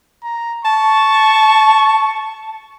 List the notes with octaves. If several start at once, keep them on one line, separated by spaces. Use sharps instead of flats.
A#5
A5 C#6